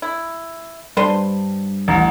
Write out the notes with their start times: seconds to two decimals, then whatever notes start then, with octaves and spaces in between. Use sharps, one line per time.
0.02 E4
0.97 G2 D4 B4 C5 C6
1.88 A1 F#5 A#5